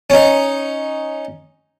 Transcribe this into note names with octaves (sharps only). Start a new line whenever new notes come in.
C#4 D#4